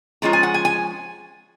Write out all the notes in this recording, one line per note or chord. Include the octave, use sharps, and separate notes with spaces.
F3 G#3 C#4 F4 A#5
G#5
F#5
G#5
G#5